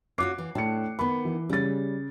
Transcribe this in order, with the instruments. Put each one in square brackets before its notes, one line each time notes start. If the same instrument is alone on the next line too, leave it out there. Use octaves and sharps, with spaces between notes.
[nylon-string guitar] C#4 F4 F#4 [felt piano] D6 F#6 C7
[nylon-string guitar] E3
[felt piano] A2 C#7 [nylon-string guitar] D4
[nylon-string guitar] D#3 B3 [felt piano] B5
[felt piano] E3
[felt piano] C#3 A6 [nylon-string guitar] G3 C#4